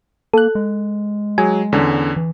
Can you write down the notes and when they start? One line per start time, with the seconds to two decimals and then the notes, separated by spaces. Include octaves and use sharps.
0.34 A#3 A4 F#6
0.55 G#3
1.38 F#3 G#4 G#5
1.72 E2 D3 C#4
2.17 E3